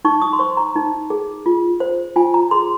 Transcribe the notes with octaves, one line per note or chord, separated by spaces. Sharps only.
D#4 C#6
D#6
C6
C5 C#6
A#5
D#4
G#4
F4
C5
F4 G#5
A#5
G#4 C6